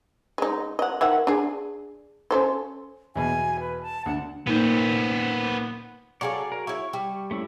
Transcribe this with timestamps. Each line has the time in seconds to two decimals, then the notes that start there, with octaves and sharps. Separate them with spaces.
0.38 G#3 D#4
0.79 D#5 F#5
1.01 D#3 E5 F#5
1.27 D4 G#4
2.31 C#4 A4 C5
3.16 E2 B2 G#5
3.60 B4
3.82 A5
4.06 D2 D3 F#5
4.47 A#2 D#3 B3 C5
6.21 F#3 G#4 A4 C#5 D5 F5
6.52 A#4
6.67 E4 C#5 C#6
6.93 G3
7.31 A3 C#4 E4